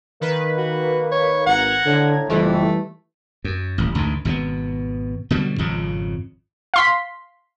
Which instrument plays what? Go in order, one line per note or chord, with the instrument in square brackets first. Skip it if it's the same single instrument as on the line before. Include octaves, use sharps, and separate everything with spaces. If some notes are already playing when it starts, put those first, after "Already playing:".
[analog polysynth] D#3 B4 [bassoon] A#3
[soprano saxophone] F#4
C#5
[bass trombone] G#1 [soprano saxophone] F#5 [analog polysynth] A#5 G#6
[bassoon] A2 [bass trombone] D3
[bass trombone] F#1 [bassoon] F2 [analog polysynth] E3 G3 [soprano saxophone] A3
[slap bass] F#2
D#1 A1
A1 D2 G#2 D#3
G#1 B2 E3 B3
B2 D3 F#3 G3
G#1 F2 C#3
[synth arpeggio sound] F5 C6 B6